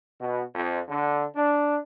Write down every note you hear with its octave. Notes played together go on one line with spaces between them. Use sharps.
B2
F2
D3
D4